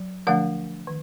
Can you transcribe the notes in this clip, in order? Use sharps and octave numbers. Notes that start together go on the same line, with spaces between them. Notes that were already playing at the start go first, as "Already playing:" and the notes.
Already playing: F#3
D3 F3 A3 D4 F#5
D#3